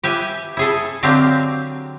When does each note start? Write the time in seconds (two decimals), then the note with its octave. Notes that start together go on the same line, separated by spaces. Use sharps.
0.04 G4 B4 E5 G#5
0.57 E4 G#4 A4
1.03 D3 F#3 C4 G4 F5